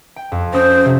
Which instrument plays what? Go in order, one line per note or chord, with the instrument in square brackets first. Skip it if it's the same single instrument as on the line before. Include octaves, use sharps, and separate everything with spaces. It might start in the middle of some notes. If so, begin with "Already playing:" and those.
[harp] G5
F2
[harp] C#4 D#6 [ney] C5
[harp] C3